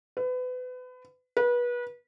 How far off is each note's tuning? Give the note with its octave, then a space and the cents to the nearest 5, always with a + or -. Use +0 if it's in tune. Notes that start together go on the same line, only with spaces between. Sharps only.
B4 +30
B4 -30